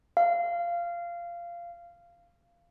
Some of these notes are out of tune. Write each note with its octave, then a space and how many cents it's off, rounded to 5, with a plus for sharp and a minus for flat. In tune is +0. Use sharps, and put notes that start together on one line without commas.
F5 -15